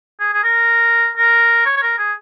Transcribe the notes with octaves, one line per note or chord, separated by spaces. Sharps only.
G#4
G#4
A#4
A#4
C#5
C#5
A#4
G#4